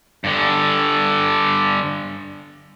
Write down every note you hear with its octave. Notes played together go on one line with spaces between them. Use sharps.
G2 D3